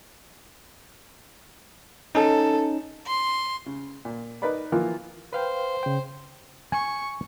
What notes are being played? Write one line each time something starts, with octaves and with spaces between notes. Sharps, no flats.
C#4 D#4 A4
C6
C#3
A#2
D#4 A#4 B4 D5 B5
E3 F3 A#3 F4
B4 C5 F5 G5
C#3 G5
G#5 C#6